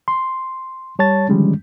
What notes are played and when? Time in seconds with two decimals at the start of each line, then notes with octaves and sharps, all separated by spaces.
0.08 C6
0.99 G3 C#5 A5 A6
1.29 D3 D#3 F3 G3 G#3 C#4